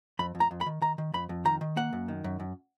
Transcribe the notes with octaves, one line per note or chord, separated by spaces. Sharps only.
F2 B5
F2
A#5
F2
B5
D#3
D#3 A#5
D#3
F2 B5
F2
D#3 A#5
D#3
A#3 F#5
F#2
D#3
F#2
F#2